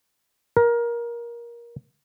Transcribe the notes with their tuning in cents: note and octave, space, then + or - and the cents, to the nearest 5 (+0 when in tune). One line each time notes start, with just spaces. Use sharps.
A#4 +20